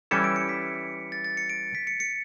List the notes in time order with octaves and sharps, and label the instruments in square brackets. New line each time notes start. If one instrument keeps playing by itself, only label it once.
[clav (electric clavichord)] E3 G3 C#4 E4 A4 [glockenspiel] C#7
[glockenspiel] D7
C#7
B6
A6
A6
C#7
D7
B6
C#7
C#7